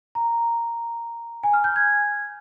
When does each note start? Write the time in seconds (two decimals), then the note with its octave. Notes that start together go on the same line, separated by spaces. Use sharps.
0.15 A#5
1.43 G#5
1.53 F6
1.64 G6
1.76 G#6